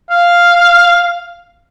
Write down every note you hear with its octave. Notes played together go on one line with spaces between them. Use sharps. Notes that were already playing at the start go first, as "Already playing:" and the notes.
F5